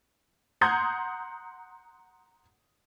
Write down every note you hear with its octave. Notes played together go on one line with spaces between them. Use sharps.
F#5 A#5 C6 D#6 G6 G#6